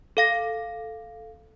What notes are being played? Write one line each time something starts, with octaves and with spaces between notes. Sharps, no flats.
A4 F5 A#6